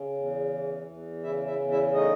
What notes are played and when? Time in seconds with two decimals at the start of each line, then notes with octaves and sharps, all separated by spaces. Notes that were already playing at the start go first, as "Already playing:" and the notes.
Already playing: C#3
0.16 E2
0.52 E3
0.87 E2
1.23 C#3 E4 E5
1.47 E4 E5
1.59 E2
1.71 E4 E5
1.94 A3 D#4 D#5